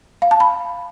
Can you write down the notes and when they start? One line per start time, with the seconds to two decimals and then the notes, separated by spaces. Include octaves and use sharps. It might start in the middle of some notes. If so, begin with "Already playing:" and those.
0.22 F5
0.31 A5
0.40 B5